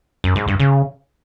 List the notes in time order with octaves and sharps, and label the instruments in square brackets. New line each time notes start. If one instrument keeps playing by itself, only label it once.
[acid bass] F#2
G#2
G2
C#3